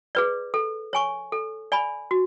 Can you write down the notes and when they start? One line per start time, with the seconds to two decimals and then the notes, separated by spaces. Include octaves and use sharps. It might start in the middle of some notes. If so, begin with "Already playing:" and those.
0.15 G#4 B4 D5
0.54 A4
0.93 C#5 G#5 C#6
1.32 A4
1.72 D5 G#5 B5
2.11 F#4